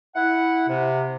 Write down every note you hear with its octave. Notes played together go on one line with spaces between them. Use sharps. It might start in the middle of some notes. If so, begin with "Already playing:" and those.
E4 F#5
C3